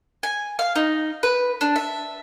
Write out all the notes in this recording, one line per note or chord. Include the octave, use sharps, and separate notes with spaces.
G#5
F5
D#4
B4
D4
E5